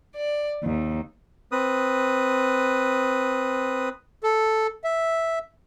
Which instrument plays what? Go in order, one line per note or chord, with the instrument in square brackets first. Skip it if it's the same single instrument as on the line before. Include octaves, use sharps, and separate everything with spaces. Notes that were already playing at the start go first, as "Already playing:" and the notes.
[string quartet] D5
D#2
[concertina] C4 B4 D#6
[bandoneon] A4
E5